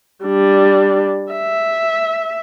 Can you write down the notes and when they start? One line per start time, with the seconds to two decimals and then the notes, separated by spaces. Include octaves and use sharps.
0.24 G3 D4
1.33 E5